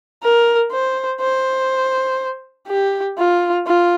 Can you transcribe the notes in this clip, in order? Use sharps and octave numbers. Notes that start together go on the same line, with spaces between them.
A#4
C5
C5
G4
F4
F4